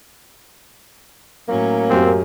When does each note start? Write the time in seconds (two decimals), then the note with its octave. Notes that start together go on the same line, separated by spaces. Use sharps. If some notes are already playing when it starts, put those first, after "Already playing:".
1.48 A2 F#3 A#3 C#4
1.90 F#2 C4 G4